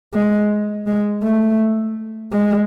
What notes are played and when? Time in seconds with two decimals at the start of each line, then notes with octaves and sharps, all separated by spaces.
0.14 G#3
0.87 G#3
1.23 A3
2.32 G#3